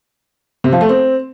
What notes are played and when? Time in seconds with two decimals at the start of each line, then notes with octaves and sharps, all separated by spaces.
0.64 C3
0.72 F3
0.81 A3
0.89 C4